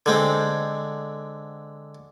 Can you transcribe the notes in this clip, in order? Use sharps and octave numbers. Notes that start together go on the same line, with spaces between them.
D3 G#3 C4